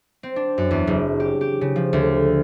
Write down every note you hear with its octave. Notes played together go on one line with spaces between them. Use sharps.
C4
D4
F#2
E2
F#1
G4
G4
C#3
F3
D2